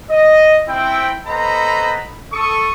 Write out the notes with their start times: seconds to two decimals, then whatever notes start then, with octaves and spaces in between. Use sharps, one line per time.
0.10 D#5
0.68 C4 E4 G5
1.27 B3 A4 C5 D#5 A#5 B5
2.33 A4 C#6 D#6